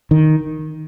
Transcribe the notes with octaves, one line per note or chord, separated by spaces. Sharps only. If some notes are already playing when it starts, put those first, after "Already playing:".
D#3